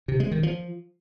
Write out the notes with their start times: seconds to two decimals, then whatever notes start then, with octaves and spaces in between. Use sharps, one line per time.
0.08 C3
0.20 G#3
0.31 D#3
0.43 F3